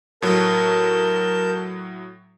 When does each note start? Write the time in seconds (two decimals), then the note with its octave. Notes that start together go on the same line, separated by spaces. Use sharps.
0.22 A2 F#3 A#4 A5 G6